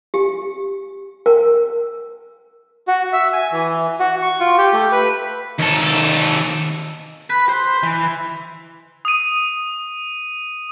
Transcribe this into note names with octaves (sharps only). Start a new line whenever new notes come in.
G4
A#4
F#4
E5
G#5
E3
F#4
C#6
F4
G4
A3
B4
D#2 A4
B4
C5
E3
D#6 D#7